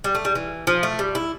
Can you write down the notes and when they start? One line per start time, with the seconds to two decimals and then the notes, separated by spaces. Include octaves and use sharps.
0.04 G3
0.15 A3
0.25 G3
0.35 E3
0.67 F3
0.83 A3
0.99 G3
1.15 E4